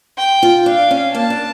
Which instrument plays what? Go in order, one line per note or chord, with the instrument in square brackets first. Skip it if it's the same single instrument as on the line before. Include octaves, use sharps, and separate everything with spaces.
[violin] G5
[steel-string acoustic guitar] F4
[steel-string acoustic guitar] D4 [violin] F5
[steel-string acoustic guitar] C#4
[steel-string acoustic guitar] A#3 [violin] A5
[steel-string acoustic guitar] D4